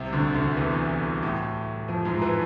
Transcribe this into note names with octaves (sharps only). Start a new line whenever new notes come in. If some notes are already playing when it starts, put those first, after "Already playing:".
Already playing: C2 C3
D2 D3
D2 D3
E2 E3
A2 A3
F2 F3
G#2 G#3
E3 E4